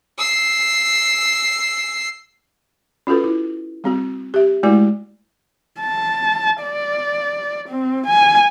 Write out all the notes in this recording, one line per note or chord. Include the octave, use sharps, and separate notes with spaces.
E6 C7
C#4 F4 F#4 A4 B4
E4
G3 C4 F#4
G4 E5
G#3 A3 E4 F#4 D5
A5
D5
C4
G#5